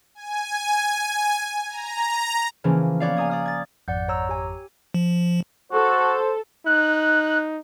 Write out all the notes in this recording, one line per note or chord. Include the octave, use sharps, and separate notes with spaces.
G#5
A#5
C#3 E3 F3 A#3 C#4
B3 C#5 D5 F5
G#5 A#5 D#6 G#6
D5 D#6 F6
G#6 A6
G#1 F2 D5 F#5 G6
C#5 A#5 E6
G4 G#5
F3
F#4 A4 C5
D#4 F#6